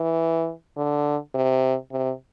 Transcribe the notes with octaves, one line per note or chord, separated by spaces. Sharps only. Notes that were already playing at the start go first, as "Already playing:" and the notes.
Already playing: E3
D3
C3
C3